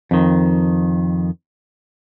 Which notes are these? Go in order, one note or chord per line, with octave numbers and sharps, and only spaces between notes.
F2 D#3